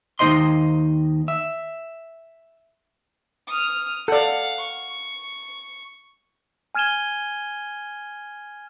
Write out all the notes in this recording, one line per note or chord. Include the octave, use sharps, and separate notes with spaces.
D#2 F#3 D#4 C5 D#5 C6
E5
D#6 F6
A4 D5 F5 F#5
C#6
G#5 F6 G#6 D#7 E7 G7